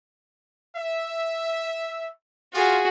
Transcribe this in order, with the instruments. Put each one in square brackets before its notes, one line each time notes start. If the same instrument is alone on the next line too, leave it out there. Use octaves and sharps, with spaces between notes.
[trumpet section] E5
[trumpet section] F4 [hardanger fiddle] F#4 G#4